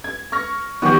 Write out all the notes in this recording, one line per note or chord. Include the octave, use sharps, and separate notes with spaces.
G#6
C#6 F6 A#6
D#3 E3 B3 F#4 G4